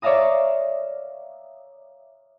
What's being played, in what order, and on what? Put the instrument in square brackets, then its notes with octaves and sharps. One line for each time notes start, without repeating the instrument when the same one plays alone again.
[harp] C#5 D5 E5 F5 A#5 D#6